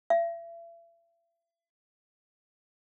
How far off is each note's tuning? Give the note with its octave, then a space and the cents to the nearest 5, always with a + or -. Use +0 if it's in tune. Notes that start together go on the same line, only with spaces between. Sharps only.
E5 +40